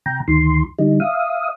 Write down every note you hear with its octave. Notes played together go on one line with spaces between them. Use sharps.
C3 G5 A#5
D2 D#3 C6
D3 G3 D#4
E5 F5 D#6